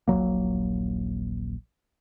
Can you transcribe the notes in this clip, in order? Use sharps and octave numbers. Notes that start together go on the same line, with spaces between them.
D#1 A#1 F#3 A#3